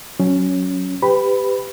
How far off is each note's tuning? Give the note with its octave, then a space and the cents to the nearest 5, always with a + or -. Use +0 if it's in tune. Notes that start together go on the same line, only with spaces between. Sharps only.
F#3 +0 C#4 +0
G4 +10 B4 +25 B5 +0